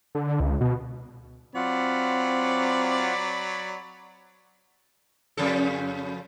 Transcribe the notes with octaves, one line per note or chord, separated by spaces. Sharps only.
D3
C#2
B2
F#3 C4 F4 D5 F#5 B5
F2 C#3 A4